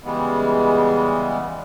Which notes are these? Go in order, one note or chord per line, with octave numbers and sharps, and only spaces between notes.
C#3 E3 G3 G#3 B3